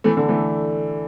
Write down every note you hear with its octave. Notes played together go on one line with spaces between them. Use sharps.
E3 A3
D3
E3 A3